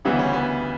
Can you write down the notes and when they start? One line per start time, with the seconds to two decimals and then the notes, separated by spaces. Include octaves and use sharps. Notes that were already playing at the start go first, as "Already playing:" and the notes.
0.05 D2 C#3 E3 G3 B3
0.19 C#4
0.33 B3